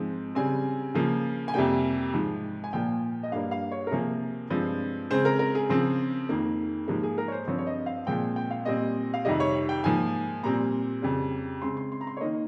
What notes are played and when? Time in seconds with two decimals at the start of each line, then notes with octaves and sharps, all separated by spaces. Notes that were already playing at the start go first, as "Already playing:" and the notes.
Already playing: G#2 F3 G#3 C4
0.35 C#3 G3 C4 G#5
0.94 C#3 F3 A#3
1.48 G#5
1.54 F2 C3 G3 A#3 G5
2.14 G#2 F3 G#3
2.64 G#5
2.73 A#2 F3 A#3 G5
3.23 D#5
3.32 G2 G3 A#3 F5
3.51 F5
3.71 C#5
3.87 A#4
3.91 C3 F3 A#3 G#4
4.50 G2 F3 G#3 C4
5.10 C#3 G#3 C4 C5
5.25 A#4
5.39 A#4
5.55 G#4
5.69 C#3 F3 C4
6.29 F2 D#3 A#3
6.88 G#2 F3 A#3 G4
7.03 G#4
7.18 A#4
7.28 C#5
7.32 C5
7.47 G2 F3 C4 C#5
7.58 C#5
7.67 D#5
7.86 F5
8.06 A#2 F3 G#3 C4 G5
8.36 G5
8.51 F5
8.65 A#2 G3 C4 D#5
9.14 F5
9.25 F2 C3 D#3 G3 D#5
9.40 C#5
9.69 G5
9.84 G#2 F3 A#3 G#5
10.43 A#2 G3 C4 A#5
11.02 F2 C#3 G3
11.62 C#3 G#3 C4 C6
11.77 C6
11.92 C6
12.01 A#5
12.07 C6
12.17 C#5
12.21 D#3 A#3 D#5